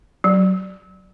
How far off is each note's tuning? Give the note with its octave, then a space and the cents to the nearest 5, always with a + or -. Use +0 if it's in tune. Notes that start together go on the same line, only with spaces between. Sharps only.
F#3 +10